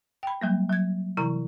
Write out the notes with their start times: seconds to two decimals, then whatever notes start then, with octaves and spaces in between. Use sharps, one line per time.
0.23 G5 B5
0.41 F#3 G3 A#3
0.70 F#3 G#6
1.17 C3 E3 E4 A#5